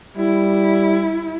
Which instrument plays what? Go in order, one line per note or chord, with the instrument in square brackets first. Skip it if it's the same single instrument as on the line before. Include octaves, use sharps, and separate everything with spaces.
[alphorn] G3 [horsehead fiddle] E4